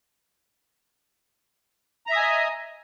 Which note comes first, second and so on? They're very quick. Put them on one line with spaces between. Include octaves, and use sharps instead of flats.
A#5 E5 D#6 G#5 D#5